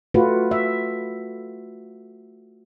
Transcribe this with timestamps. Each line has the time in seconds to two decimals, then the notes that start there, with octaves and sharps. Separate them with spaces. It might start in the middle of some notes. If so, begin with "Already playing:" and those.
0.14 A3 F4 F#4 B4
0.51 E5